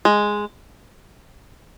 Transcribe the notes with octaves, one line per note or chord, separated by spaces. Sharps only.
G#3